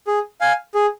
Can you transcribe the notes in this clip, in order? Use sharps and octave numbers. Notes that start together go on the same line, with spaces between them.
G#4
F5 G#5
G#4